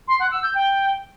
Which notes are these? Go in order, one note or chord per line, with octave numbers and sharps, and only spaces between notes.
C6
F#5
E6
G6
G5